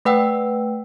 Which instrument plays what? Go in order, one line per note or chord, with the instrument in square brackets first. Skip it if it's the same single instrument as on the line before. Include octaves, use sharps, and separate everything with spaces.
[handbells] A3 B4 F#5 G5 E6